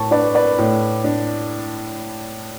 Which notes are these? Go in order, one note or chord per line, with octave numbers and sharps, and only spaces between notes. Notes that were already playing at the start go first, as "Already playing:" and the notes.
Already playing: A2 A5 C#6
D4 B4 D5
B4 D5
A2
D4